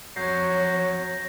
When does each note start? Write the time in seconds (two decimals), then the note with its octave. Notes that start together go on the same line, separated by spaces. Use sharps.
0.16 F2 F#3 C#5 G6 A#6 C7